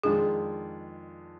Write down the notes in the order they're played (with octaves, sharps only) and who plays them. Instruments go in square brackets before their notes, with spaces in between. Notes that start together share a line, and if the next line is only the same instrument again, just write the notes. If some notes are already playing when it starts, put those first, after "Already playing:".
[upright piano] F2 D#3 G#3 D4 F4 [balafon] G#4